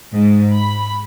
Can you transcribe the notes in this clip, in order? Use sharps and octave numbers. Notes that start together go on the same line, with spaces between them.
G#2
B5